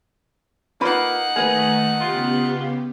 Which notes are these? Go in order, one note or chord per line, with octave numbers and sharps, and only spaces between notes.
A#3 D#4 F4 B4 F#5 B5
D#3 A3 A#3 G#4 B4
C#3 B3 F4 G4